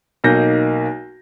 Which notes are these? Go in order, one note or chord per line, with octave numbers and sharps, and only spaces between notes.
B1 A#3 D#4 G6 A#6